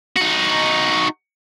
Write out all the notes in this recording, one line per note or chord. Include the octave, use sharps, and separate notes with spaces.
D#4 F#4